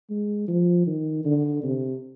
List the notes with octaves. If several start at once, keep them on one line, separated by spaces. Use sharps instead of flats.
G#3
F3
D#3
D3
C3